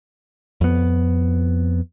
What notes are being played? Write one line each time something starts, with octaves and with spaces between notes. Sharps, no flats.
F2 B3